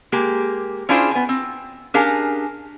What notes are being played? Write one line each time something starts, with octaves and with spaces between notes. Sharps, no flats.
G#3 A#3 G4
C#4 D4 E4 F4 G#4 C5
B3 G#5
C4
C#4 D4 G4 G#4 A#4 F5